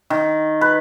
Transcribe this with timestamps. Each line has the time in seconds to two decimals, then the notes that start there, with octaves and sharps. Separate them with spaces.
0.10 D#3
0.61 B4